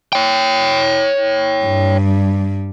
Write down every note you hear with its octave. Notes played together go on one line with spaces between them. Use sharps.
C#5 G5
G2 G3